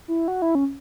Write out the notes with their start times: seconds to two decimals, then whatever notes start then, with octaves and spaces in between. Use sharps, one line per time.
0.08 E4
0.28 F#4
0.42 E4
0.55 C#4